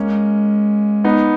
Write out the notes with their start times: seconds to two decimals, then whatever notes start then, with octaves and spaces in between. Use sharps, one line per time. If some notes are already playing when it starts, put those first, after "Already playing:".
Already playing: G#3 A#3 C#4
1.04 B3 D#4